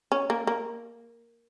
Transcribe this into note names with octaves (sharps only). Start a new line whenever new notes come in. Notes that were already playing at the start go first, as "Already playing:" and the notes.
C#4
A#3
A#3